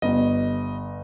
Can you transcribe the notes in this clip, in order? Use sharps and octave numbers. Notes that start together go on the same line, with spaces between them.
G1 D#5